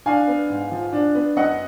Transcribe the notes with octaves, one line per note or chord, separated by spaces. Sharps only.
D4 F5 G#5
B3
G#2
F3
D4
B3
F#2 D#5 F#5